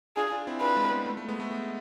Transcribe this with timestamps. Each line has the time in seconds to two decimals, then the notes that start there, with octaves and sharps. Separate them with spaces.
0.16 D4 F4 G#4
0.32 D4 F4
0.47 C4 E4
0.61 D4 F4 B4
0.77 G#3
0.84 C4
0.91 G#3 B3
1.06 A3
1.17 A3
1.28 G#3 B3
1.40 A3
1.51 G#3